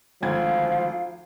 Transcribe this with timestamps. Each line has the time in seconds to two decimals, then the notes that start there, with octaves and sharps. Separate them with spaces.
0.22 G#1 D2 F3 F5 G#6